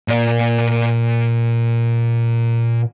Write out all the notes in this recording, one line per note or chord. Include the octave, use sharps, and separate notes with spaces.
A#2 D5